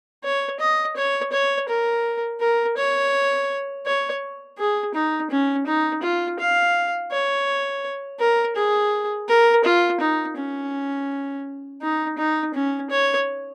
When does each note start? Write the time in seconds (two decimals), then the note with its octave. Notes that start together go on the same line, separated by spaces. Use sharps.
0.24 C#5
0.60 D#5
0.97 C#5
1.33 C#5
1.69 A#4
2.41 A#4
2.77 C#5
3.86 C#5
4.58 G#4
4.95 D#4
5.30 C#4
5.67 D#4
6.03 F4
6.39 F5
7.12 C#5
8.20 A#4
8.56 G#4
9.29 A#4
9.65 F4
10.01 D#4
10.37 C#4
11.82 D#4
12.18 D#4
12.54 C#4
12.91 C#5